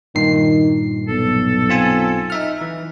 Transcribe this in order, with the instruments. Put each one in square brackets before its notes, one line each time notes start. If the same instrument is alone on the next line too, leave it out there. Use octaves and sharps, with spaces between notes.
[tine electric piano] G2 A#2 C7 [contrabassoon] D#3
[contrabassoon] B1 [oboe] A4
[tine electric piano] C4 F4 G#5
D#4 E5 F6
E3